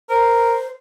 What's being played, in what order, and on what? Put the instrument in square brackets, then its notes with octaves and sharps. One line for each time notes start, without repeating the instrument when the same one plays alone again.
[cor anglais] A#4 [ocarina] C5